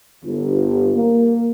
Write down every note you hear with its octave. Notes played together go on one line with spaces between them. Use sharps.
G1
A#3